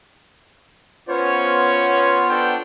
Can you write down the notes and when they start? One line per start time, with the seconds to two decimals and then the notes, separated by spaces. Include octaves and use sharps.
1.09 B3 C#4 F4 C5 C#5
2.30 D4 A4 G5